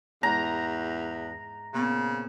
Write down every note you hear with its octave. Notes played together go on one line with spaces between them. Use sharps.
E2 G#2 A#5
A#2 C#3 B3 C4